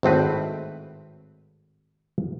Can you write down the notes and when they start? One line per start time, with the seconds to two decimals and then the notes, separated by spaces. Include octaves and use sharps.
0.03 G#1 A2 C4 B4